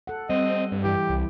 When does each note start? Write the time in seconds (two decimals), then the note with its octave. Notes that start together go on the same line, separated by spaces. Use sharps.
0.07 A4 F#5
0.30 G3 C4 D#5
0.72 G2
0.84 E3 E4 G4
1.10 C2